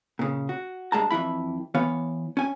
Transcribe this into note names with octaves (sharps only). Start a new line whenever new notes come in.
A#2 C#3
F#4
G2 G#3 A5 A#5
F2 E3 E4 B5
E3 B3 C#5 F5
C#4 G#5